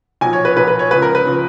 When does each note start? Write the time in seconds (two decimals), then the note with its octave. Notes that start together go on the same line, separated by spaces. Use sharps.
0.21 B1 A#2 F3 G#5
0.33 C#5
0.45 B4
0.56 B1 A#2 F3 B4
0.68 B4
0.79 C#5
0.91 C#2 C#3 F3 B4
1.02 A#4
1.15 B4
1.26 C#3 F3